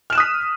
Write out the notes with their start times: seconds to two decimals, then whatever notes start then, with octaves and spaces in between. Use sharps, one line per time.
0.10 F6
0.12 E7
0.15 F#6
0.18 D#6
0.20 B6